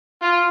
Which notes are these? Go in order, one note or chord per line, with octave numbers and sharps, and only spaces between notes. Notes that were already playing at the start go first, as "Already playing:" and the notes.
F4